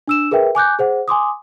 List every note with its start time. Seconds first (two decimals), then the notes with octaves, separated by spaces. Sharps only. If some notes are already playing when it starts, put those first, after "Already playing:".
0.08 D4 E6 E7
0.31 G#4 A#4 B4 E5 G5
0.55 G#5 D6 F#6 G6
0.79 G#4 C5 F#5
1.08 G#5 C6 D6 D#6